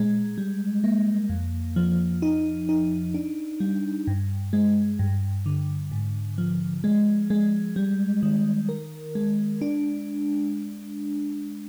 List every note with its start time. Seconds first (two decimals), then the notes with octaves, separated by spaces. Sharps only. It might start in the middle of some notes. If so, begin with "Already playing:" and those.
Already playing: A#2 G#3
0.38 G3
0.84 A#3
1.29 F2
1.76 F3
2.22 D#4
2.69 D#4
3.14 D4
3.60 G3
4.07 G2
4.53 G#3
4.99 G2
5.46 D3
5.92 G#2
6.38 F3
6.84 G#3
7.30 G#3
7.76 G3
8.23 D#3
8.69 A#4
9.15 G#3
9.61 D4